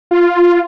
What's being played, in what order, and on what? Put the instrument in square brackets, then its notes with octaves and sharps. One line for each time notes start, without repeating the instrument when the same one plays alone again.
[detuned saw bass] F4